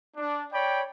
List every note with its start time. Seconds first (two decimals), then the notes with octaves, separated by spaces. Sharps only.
0.17 D4
0.52 C#5 D5 G5 B5